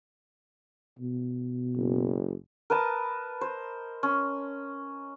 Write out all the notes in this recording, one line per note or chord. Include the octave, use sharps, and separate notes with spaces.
B2
F#1
A#4 B4 D#5 A5
C5
C#4